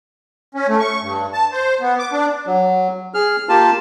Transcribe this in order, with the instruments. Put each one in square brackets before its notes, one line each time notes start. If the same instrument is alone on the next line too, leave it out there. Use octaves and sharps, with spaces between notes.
[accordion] C#4
A3
C#6
G2
A5
C5
B3
D6
D4
[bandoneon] F#3
G#4 F6
A#3 F4 G4 A5